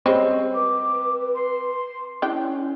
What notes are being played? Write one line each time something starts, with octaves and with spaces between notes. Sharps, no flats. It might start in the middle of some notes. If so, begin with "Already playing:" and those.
G3 G#3 C4 C#4
B4 D6
C6
C#4 D4 E4 G5